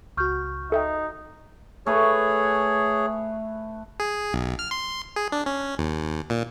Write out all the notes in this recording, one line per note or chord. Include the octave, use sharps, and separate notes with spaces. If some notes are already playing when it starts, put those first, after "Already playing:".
C#2 F#4 C#6 F6 G6
D#4 A4 E5 G5
A3 G#4 B4 C#5
G#4
B1
F6
C6
G#4
D4
C#4
D#2
A#2